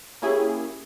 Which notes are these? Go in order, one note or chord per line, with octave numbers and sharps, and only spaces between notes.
A#3 C#4 E4 G4 G#4